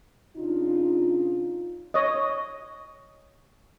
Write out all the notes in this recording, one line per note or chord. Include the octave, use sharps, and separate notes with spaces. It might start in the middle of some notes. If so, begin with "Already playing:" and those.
C#3 D4 D#4 F4
C#5 D#5